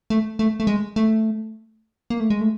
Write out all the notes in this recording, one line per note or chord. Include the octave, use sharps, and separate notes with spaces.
A3
A3
A3
G#3
A3
A#3
A3
G#3
A3